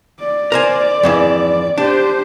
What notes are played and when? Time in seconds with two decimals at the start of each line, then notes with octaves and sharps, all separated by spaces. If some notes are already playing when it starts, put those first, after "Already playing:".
0.20 D5
0.52 A#4 C5 G#5
1.03 F2 G#2 E3
1.78 D4 G4 C5